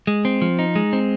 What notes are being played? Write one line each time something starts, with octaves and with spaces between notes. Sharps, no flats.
G#3
C4
F3
D#4
G#3
C4